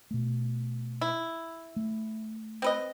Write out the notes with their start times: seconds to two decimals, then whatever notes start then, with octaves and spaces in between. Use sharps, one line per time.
0.11 B2 A3
1.01 E4
1.76 A3
2.62 C4 B4 D#5